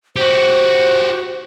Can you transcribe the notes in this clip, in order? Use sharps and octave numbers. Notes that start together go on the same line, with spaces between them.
F#4 G4 C5